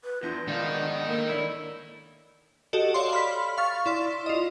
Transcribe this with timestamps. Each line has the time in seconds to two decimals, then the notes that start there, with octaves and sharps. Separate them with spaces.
0.04 B4
0.23 E2 D4 F4 G6 A#6
0.48 G#2 D#3 B3 D4 D#4 D5 F5 A5
1.06 A#3 D4 A4 A#4
1.29 E4 C#5 D5
2.73 F#4 G4 A4 D#5
2.94 C#5 D5 F5 C6
3.13 B5 F6 B6
3.57 F5 C#6 F6 A6
3.86 E4 D5 C6
4.26 F4 D#5